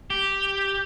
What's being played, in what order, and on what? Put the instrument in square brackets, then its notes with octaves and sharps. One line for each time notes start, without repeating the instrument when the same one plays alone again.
[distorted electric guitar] G4